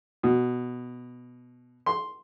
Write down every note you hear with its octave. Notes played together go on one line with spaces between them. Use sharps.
B2
C6